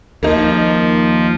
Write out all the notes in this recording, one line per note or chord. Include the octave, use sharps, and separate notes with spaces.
D#2 F3 A#3 D#4